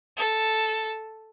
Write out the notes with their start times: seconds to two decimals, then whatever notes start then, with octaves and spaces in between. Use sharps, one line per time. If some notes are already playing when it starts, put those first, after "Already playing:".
0.17 A4